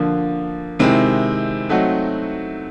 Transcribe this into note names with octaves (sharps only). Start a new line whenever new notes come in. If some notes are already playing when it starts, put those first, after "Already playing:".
Already playing: D3 F3 A#3
C3 D#3 G#3 C4 E4
F#3 A3 C4 D#4 F#4